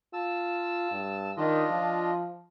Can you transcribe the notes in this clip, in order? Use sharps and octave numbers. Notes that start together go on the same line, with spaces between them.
F4 A5 E6
G2
D#3 D4 F4 D#5
F3